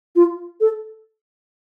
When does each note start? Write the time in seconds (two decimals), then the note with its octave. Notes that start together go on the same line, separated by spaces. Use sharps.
0.16 F4
0.61 A4